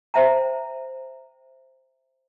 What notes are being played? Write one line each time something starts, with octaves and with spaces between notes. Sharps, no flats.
C5 E5 G5 A#5